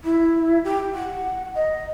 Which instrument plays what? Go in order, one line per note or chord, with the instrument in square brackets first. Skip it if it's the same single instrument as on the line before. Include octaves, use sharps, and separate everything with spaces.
[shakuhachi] E4
G4
F#5
D#5